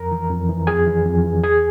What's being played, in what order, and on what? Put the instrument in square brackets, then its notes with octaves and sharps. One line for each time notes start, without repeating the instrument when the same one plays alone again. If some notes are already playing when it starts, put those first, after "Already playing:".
Already playing: [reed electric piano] F2 A#4 A#5
E3
F2
E3
F2 G#4 G#5
E3
F2
E3
E2 G#4 G#5